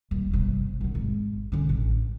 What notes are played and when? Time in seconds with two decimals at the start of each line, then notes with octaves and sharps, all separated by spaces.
0.11 D#1
0.32 G1 C3
0.81 F#2 C3
0.95 G#1
1.52 D3 C#4
1.69 A1